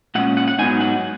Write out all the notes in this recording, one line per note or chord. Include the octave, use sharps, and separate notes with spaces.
A#2 G#3 C#4 F#5
F#5
F#5
G#2 F#3 B3 D#4 G#5
F#5